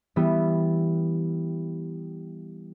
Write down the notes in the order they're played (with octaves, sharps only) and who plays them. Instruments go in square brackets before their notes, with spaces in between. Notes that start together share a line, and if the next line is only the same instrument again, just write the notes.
[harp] E3 G3 B3 E4